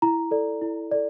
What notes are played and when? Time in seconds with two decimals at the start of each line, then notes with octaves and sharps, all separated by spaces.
0.02 E4 A#5
0.31 A4 D5
0.61 E4
0.92 A4 D5